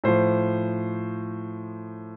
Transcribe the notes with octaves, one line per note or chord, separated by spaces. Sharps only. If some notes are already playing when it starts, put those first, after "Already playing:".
A2 F3 C5